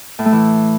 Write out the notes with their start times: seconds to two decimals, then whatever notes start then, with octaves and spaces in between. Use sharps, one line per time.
0.19 A2
0.25 A3
0.32 E3